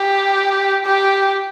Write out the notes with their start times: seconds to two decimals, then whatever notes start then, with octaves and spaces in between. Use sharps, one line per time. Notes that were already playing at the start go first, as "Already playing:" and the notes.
Already playing: G4
0.85 G4